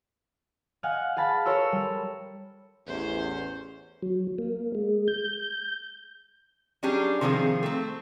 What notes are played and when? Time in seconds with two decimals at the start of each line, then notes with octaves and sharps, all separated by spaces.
0.83 D#5 F5 F#5 G#5
1.17 G#4 F5 A5 B5
1.46 A4 A#4 C5 C#5 C#6 E6
1.72 G3
2.87 A1 E2 C#4 C5
4.02 F#3
4.38 A#3
4.75 G#3
5.08 G6
6.83 F#3 G3 C#4 D4 G4 G#4
7.21 C3 D#3 F3 C4 G#4
7.63 A3 C4